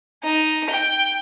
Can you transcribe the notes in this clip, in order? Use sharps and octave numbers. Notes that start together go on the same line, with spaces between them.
D#4
G5